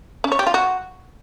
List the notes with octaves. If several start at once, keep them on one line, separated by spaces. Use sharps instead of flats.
C#4
C#5
G4
F4
F#4